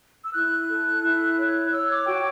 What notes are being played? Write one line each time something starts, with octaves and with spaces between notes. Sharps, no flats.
E6
E4 F#6
A4
E4
C#5
C#5 E6
D6
F#4 G5